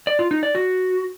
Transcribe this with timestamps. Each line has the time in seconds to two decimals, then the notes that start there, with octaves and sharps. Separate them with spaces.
0.07 D5
0.19 F4
0.31 D#4
0.43 D5
0.55 F#4